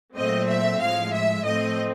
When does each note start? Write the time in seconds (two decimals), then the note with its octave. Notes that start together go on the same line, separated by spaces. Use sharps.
0.16 A#2 F#3 A3 C4 D#5
0.48 E5
0.80 A2 F3 G#3 F5
1.14 E5
1.45 A2 F3 A3 C4 D#5